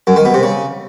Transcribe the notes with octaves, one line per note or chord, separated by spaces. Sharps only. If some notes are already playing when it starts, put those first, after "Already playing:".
F#2
D#3
B2
C3
C#3